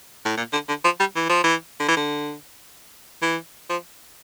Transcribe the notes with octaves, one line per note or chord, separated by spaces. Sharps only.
A2
A#2
D3
D3
F3
G3
E3
F3
E3
D3
E3
D3
E3
F3